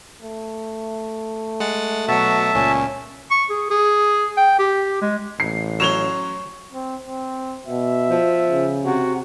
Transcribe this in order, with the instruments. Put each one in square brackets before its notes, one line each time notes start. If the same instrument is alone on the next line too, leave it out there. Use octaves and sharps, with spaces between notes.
[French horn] A3
[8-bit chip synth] G#3 F#5 A6
[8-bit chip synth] B2 F#3 [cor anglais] F#4 [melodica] E5 A5
[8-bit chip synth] C#2 A#2 [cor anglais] C#4
[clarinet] C#6
G#4
G#4
G5
G4
G#3
[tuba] A1 [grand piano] C7
[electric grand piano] F#3 C#4 [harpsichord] C5 C#5 [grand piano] E7 F7 G7
[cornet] C4
C4
[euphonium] B2 [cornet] E5
[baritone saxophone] F3
[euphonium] C#3
[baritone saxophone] C3 [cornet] F#4